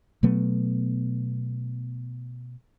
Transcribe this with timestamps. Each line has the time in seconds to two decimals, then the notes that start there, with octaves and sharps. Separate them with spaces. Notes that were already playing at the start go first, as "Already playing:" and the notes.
0.23 B2 F#3 A3 B3